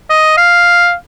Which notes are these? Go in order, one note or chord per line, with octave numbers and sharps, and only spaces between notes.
D#5
F5